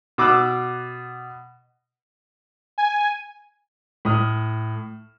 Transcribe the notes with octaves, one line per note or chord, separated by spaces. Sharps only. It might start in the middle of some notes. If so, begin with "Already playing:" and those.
B2 D6 E6 F#6
G#5
A2 D#6 F6